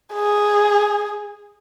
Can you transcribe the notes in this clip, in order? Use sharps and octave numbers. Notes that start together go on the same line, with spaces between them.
G#4